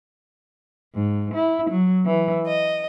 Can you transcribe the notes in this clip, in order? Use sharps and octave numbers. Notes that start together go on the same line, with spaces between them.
G#2
E4
F#3
E3
D#5